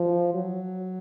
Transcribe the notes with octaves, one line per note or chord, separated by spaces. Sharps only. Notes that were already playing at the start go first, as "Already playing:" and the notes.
Already playing: F3
F#3